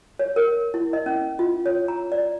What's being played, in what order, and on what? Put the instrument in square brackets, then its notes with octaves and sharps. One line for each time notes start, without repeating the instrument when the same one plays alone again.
[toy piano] C#5
A#4
E4
D#5
C#4
F4
C#5
A#5
D5